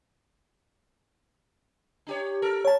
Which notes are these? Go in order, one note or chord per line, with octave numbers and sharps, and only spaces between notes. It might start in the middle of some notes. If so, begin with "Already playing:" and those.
D4 G4 C#5
A4 A#4
C#5 A5